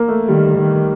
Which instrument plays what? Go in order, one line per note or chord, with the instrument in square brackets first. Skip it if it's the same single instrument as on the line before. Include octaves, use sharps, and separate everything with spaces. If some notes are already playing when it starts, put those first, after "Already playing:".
Already playing: [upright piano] A#3
A3
[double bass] D#3 [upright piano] G3
[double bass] D#3